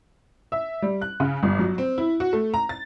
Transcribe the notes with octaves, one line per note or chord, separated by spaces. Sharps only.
E5
G3
F#6
C#3
G1
F#3
C4
E4
F#4
A3
A#5
A6